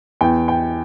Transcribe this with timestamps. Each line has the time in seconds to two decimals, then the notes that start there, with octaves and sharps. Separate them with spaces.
0.21 E2 G5
0.48 G5